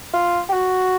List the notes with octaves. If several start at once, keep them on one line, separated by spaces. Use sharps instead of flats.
F4
G4
F#4